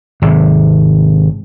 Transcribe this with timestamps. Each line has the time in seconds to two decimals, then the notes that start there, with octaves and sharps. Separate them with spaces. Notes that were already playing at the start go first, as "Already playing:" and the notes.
0.22 G#1 C3